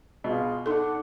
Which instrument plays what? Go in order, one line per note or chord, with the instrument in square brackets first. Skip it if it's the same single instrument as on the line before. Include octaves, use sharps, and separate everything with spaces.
[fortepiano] B2 [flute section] F4 G#4
[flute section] D4 F#5 [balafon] D#4 A4